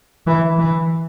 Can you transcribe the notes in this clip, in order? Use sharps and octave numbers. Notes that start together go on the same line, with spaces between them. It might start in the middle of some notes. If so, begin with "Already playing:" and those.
E3
E3